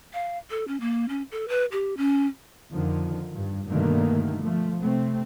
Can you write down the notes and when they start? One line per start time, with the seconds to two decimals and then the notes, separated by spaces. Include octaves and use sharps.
0.13 F5
0.51 A4
0.68 C#4
0.80 A#3
1.09 C#4
1.32 A4
1.48 B4
1.72 G4
1.97 C#4
2.73 F2 D3 D#3 F3
3.34 G2
3.69 G2 B2 D3 D#3 A3 A#3
4.43 F3 A3
4.80 C3 A3 C4